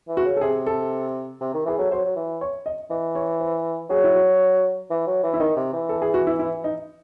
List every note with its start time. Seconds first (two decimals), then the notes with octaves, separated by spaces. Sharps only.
0.08 E3
0.17 F#4
0.25 C#3
0.37 A4
0.41 C3 G#4
0.66 A4
1.41 C3
1.54 D#3
1.65 E3 G#4
1.78 F#3 A4
1.91 F#3 C5
2.05 F#3
2.16 E3
2.41 C#5
2.66 D#5
2.90 E3 D#5
3.15 C#5
3.40 C5
3.90 F#3 G#4
4.04 E4
4.15 F#4
4.90 E3
5.07 F#3
5.23 E3
5.34 E4
5.40 D#3 D#4
5.56 C3
5.73 E3
5.89 A4
6.02 G#4
6.14 F#4
6.27 E4
6.39 E4
6.64 D#4